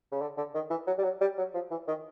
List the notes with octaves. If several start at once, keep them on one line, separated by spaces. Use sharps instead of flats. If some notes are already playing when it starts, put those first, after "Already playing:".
C#3
D3
D3
D#3
E3
F#3
G3
F#3
G3
F#3
F3
E3
D#3